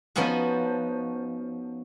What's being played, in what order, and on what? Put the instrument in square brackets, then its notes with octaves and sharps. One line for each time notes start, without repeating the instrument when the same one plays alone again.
[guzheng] F3 B3 C#4 D#4 F#4